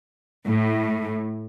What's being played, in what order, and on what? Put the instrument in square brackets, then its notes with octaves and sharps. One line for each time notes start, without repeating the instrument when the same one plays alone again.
[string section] A2